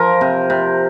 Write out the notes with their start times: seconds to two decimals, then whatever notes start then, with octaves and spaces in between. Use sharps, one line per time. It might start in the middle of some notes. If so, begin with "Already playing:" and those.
Already playing: F3 A#4
0.21 C3
0.50 C3